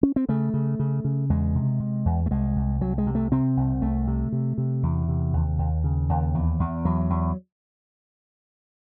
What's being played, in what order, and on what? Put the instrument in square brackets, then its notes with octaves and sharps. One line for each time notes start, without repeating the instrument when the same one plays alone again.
[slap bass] C#4
C4
C#3 A3
C#3
C#3
C#3
E2 G#3
C3
C3
E2
A3
C2 G#3
C2
C2 F#3
G#3
C3
A3
C3 C4
C2
C2 A3
C3
C3
C3
E2
C3
D#2
D#2
C#3
D#2
E2
E2
E2 F#3
E2